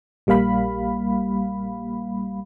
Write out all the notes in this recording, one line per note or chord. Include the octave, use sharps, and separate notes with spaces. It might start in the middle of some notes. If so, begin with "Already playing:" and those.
A#1 G3 A#3 F5 B5